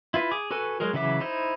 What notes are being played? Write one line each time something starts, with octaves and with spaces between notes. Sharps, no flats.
E4 F4 B4
G#4 D6
F#4 A4 B4 G#5
F#3 G#3 G#4 A#4
C#3 E3 F#3 E5 D6
D#4 E4 C5